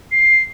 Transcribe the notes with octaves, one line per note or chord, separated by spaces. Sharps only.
C7